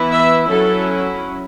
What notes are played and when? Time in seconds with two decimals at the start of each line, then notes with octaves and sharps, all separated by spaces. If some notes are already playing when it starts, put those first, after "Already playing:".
Already playing: E3 B3 E4
0.12 E5
0.50 F#3 C#4 E4 A4